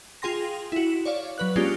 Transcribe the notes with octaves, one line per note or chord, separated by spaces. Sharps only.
F4 G#4 G5 C6 A#6
E4 F#4
C#5 D5 F5
F#3 B4 F#6
G#3 A#3 C#4 D4 F4 G4